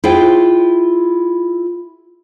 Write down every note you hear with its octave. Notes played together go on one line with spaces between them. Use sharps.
E4 F4 G#4 C5 G5